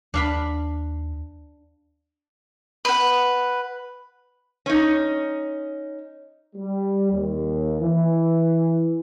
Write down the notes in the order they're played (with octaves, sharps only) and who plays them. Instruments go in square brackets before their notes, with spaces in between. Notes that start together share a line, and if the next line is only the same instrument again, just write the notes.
[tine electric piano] D#2 [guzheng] D4 F5 B5
[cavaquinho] B4 F#5
[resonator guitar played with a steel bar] C#4 D#4
[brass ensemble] G3
D#2
E3